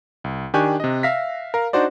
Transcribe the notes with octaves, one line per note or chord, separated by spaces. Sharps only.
C2
D#3 D4 G4 G#5 C#6 F#6
C3 D#5
E5 F5 A#6 B6
A#4 F5
D4 D#4 F#4 C5 D5